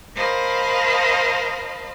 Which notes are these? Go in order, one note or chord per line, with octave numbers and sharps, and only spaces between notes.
A#4 C5 D#5 F5 A5 B5